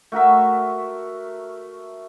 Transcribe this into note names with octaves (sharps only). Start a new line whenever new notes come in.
A3 F#4 A#4 E5